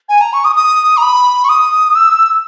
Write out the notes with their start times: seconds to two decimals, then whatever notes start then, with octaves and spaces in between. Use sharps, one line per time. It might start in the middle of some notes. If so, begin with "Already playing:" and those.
0.09 G#5
0.21 A#5
0.33 C#6
0.44 D#6
0.56 D#6
0.97 A#5
1.02 B5
1.44 C#6
1.49 D#6
1.95 E6